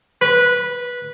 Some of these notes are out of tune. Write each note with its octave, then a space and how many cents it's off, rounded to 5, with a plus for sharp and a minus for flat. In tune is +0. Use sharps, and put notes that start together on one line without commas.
B4 -15